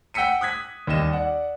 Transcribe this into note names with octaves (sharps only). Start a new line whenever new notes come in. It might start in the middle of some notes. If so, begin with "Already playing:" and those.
F#5 G5 E6 B6 C#7 D#7
D#6 F#6 G#6 B6
D#2 G3 D#5 E7
D5 F#5